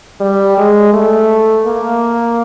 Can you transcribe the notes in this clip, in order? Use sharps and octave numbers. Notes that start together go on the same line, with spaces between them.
G3
G#3
A3
A#3